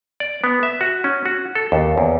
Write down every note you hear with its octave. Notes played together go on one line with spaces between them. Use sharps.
D5
B3
E5
F#4
C#4
F#4
A4
D#2
E2